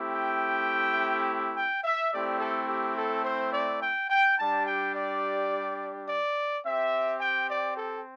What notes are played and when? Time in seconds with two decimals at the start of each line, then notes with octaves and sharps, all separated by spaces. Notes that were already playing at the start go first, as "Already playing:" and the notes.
Already playing: A3 C4 E4 G4
0.14 G5
1.57 G5
1.84 E5
2.13 A3 C4 E4 G4 D5
2.40 A4
2.68 G4
2.98 A4
3.25 C5
3.53 D5
3.82 G5
4.10 G5
4.39 G3 D4 G4 A5
4.67 G5
4.95 D5
6.09 D5
6.65 C4 G4 E5
7.21 G5
7.50 D5
7.77 A4